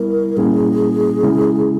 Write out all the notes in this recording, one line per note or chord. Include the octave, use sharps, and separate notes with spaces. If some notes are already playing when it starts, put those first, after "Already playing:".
Already playing: G3 B3 E4 A#4
A#2 G3 A#3 C#4 E4 G#4
C#3 G#3 C#4 E4